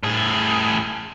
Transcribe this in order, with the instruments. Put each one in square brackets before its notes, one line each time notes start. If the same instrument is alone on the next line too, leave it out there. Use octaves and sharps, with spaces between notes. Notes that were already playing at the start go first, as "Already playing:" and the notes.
[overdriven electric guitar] A2 G#4